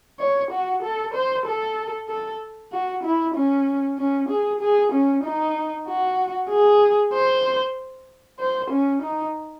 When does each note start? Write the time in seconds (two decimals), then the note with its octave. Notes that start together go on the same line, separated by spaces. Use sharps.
0.19 C#5
0.51 F#4
0.83 A4
1.14 C5
1.46 A4
2.09 A4
2.72 F#4
3.04 E4
3.35 C#4
3.98 C#4
4.29 G#4
4.61 G#4
4.92 C#4
5.24 D#4
5.87 F#4
6.50 G#4
7.13 C5
8.39 C5
8.71 C#4
9.02 D#4